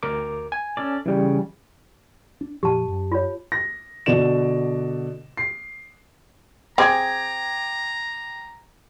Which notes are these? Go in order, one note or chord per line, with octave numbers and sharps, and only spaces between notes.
D2 A#4 D6
G#5
C#4 A4 D5
C#3 E3 G3
D4
F2 A#2 F3 G4 A5
F#2
F4 C#5
A#6
B2 D3 D5 E7
C7
C4 G#4 G5 A#5 D6 G#6